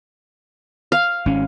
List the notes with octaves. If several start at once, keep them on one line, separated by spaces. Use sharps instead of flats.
F5
G#1 C#4